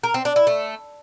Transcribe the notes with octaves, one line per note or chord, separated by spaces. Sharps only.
A#4
C4
D4
E4
A3